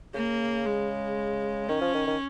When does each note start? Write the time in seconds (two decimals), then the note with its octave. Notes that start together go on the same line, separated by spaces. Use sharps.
0.14 C#3 A#3
0.65 G#3
1.69 D#3 C#4
1.81 F3
1.94 D#3
2.07 D#3